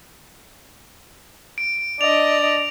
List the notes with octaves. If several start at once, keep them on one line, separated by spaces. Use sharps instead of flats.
D7
D4 D5 D#5 F7